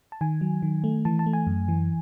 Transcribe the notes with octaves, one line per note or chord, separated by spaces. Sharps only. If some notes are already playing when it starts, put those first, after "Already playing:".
A5
D#3 G#5
F#3
D#3
A3
E3 A5
A5
A3
G#5
F#2
E3